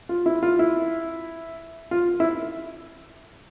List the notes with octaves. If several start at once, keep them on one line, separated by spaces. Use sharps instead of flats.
F4
E4
F4
E4
F4
E4